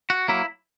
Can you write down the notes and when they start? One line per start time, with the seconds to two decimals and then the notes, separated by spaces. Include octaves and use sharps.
0.10 F#4
0.28 F#3 A#3 E4